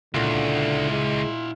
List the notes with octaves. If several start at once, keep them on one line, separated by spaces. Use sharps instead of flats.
C#2 A#2 D3 E4 F#4
G#3